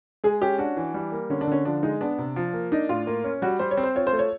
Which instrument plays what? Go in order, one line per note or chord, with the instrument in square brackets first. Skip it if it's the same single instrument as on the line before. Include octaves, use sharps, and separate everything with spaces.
[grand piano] G#3 [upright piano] G#4
[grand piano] C#4 [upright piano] G4
[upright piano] D4 [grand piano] F#4
[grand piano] E3
G3
A#3
[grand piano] D3 [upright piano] C#4
[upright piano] D4
[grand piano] D3 [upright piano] C#4
[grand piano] F3 [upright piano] D4
[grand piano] G#3 [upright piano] D#4
[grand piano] B3 [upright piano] D4
[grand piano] C3
F3
A#3
[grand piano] D4 [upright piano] D#4
[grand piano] A2 [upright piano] F4
[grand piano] A#3
C#4
[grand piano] G3 [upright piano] F#4
[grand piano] G3 [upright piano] C5
[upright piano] C#5
[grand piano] C4
[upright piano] C5
[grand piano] F4 [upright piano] C#5
[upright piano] C5
[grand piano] A3
[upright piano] C#5